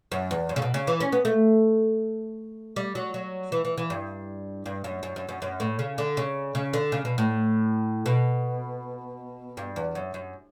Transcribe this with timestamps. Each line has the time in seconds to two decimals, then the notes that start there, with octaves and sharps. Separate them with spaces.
0.12 F#2
0.31 E2
0.49 F#2
0.56 C#3
0.62 B2
0.74 C#3
0.87 E3
1.00 C#4
1.12 B3
1.25 A3
2.76 G3
2.95 F#3
3.14 F#3
3.52 E3
3.65 E3
3.77 E3
3.90 G2
4.66 G2
4.84 F#2
5.03 F#2
5.16 F#2
5.29 F#2
5.42 F#2
5.60 A2
5.79 C#3
5.98 D3
6.17 C#3
6.55 C#3
6.73 D3
6.92 C#3
7.05 B2
7.18 A2
8.06 B2
9.57 G2
9.76 E2
9.95 F#2
10.14 F#2